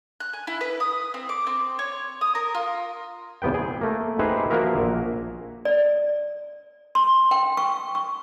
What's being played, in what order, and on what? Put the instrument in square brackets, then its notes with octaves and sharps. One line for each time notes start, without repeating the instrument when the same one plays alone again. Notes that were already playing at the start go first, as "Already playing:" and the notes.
[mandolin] F#6
G#5
E4
B4
D#6
C4
D6
C4
C#5
D#6
A#4
F4
[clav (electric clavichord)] E2 C3 B3 B4 G5
G#4
A3 A#3
D#4 G4 G#4 B4 C5 E5
F3 A#3 F#4 G#4 A#4 E5
A#1
[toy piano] D5
C6
G5
C#6
C#6